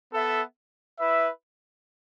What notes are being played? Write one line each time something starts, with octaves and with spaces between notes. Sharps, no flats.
B3 A4 E5
E4 B4 E5